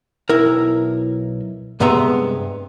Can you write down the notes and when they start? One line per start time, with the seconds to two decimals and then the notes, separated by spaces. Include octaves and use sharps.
0.29 B1 E4 A#4
1.80 G2 C3 G#3 B3 E5 A#5